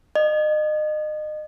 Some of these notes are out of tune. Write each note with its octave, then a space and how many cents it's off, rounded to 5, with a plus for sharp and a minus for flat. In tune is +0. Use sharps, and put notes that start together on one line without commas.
D#5 -30